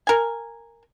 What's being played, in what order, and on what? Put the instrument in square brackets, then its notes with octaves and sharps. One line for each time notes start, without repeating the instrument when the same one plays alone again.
[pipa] A#4 G#5